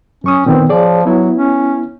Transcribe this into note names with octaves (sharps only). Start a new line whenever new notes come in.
F#2 C#4 C#6 D#6
A#2 D#3 B3 C4
F3 G#4 C#5 D5
F#3 B3 E4
C#4